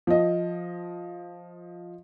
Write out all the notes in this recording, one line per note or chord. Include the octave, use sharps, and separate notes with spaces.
F3 D#5